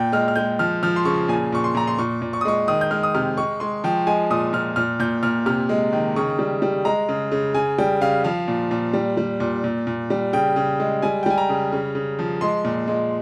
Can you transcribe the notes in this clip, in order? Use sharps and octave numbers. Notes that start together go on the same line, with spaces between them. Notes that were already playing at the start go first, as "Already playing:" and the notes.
Already playing: A#2 G5
G#3 F6
F6
G#3 G6
F3 F6
F3 F6
C6
C#3 C#6
A#2 G#5
A#2 C#6
C6
A#2 A#5
C6
A#2 C#6
A#2
C#6
D#6
G#3 C#6
D#3 D#6
G6
G#3 F6
D#6
C3 F6
G#3 C#6
G#3 C6
F3 G5
G#3 G#5
A#2 D#6
A#2 F6
A#2 F6
A#2 G6
A#2 F6
C3 F6
G#3
D#3
C#3 C#6
G3
G3
G#3 A#5
C#3
C#3
C#3 G#5
G3 G5
C#3 F5
F3 F5
A#2
A#2
G3
G3
A#2
A#2
A#2
G3
C#3 G5
C#3
G#3
G3 G#5
G5
G3 G#5
A#5
C#3
C#3
C#3
F3
G#3 C6
A#2
G#3